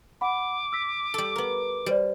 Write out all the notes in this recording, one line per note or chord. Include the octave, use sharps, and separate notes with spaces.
F#5 B5 D6
E6 B6
G3 A4
B3 A#4
G3 F#4 C5 D5